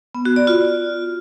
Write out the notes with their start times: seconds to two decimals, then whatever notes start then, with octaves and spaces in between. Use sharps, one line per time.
0.15 B3
0.25 F#4
0.36 D5
0.47 F4